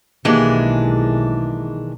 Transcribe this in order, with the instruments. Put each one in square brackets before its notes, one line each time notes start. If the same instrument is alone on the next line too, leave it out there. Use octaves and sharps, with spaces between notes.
[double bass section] B1 [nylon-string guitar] D#3 A#3 G4 [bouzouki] E3 G#3 D4